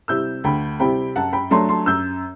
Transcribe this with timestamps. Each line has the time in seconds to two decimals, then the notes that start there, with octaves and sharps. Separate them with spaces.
0.08 C3 G3 C4 E4 E6 G6
0.44 D2 G5 B5
0.80 C3 G3 C4 E4 G5 B5
1.16 F#2 F#5 A5
1.33 G5 B5
1.51 F#3 A3 D4 A5 C6
1.69 A5 C6
1.86 F#2 E6 G6